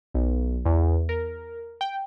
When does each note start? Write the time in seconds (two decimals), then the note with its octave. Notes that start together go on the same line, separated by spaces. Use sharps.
0.14 B1
0.65 E2
1.09 A#4
1.81 G5